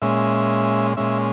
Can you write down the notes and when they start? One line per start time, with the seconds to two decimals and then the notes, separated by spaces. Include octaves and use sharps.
0.02 A#2 G#3 C#4 E5
0.97 A#2 G#3 C#4 E5